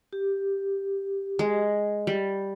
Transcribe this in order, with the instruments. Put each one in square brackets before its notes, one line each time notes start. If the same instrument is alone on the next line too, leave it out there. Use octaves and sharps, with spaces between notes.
[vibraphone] G4
[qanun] G#3
G3